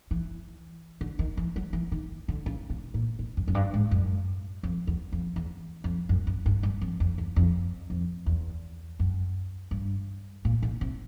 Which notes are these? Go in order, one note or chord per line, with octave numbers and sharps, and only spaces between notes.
E3
D3
D#3
E3
F#3
E3
D#3
D3
C#3
B2
A#2
B2
F#2
F#2
G2
G#2
F#2
F2
E2
F2
E2
F2
F#2
F#2
G2
G2
F2
F2
E2
F2
F2
E2
F#2
G2
A#2
B2
C3